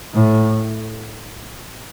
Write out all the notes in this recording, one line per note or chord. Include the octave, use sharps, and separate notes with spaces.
A2